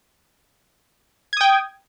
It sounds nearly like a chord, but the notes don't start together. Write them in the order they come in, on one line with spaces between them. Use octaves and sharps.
G#6 D#6 G5